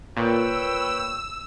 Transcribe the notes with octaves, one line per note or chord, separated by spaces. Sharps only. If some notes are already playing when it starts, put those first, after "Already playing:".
A#2 B4 C#5 G5 E6